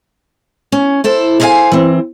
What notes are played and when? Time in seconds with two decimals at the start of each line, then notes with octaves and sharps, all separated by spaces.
0.72 C#4
1.04 E4 A4 C5
1.40 G#4 A#4 C5 D#5 F5 G#5
1.72 E3 C4